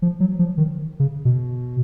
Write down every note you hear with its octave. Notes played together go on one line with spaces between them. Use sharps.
F3
F#3
F3
D#3
C#3
B2